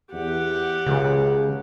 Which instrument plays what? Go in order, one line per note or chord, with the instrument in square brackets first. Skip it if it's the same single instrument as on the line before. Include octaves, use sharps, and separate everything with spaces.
[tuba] E2 [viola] G4 F#5
[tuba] C#2 [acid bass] C#3